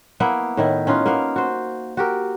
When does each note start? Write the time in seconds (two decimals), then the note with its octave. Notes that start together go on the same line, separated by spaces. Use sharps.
0.20 A#3 B3 E4
0.57 A2 D#3 E4
0.87 C#4 D#4 F4 B4
1.06 A#3 B3 F5
1.36 F#4 C5
1.97 F#4 G4 A#4